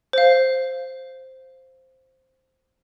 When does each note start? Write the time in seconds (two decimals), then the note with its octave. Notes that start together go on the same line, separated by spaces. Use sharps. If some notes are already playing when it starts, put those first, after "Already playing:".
0.13 C5 F5